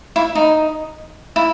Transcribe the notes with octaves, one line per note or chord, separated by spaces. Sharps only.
E4
D#4
E4